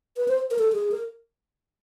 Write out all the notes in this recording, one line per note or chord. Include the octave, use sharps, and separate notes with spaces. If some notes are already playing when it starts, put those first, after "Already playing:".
B4
C5
A#4
A4
G#4
A#4